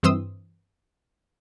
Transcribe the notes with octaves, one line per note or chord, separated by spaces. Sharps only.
G2 E3 C4 C6 D#6 E6